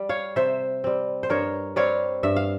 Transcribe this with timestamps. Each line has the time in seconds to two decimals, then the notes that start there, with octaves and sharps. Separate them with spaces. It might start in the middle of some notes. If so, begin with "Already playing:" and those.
Already playing: G3
0.09 C#5 F5
0.36 C3 C5 E5
0.84 G3 C4
1.23 C5
1.30 G2 A#4 C#5
1.76 G3 C4 C#5 F5
2.23 G2 E5
2.36 F5